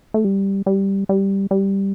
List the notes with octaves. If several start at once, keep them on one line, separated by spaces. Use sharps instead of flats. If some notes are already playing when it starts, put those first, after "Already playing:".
A3
G3
G3
G3
G3